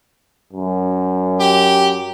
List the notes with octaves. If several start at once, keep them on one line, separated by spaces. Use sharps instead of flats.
F#2
G4